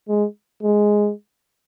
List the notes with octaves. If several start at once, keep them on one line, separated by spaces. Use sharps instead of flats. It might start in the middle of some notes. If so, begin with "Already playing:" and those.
G#3
G#3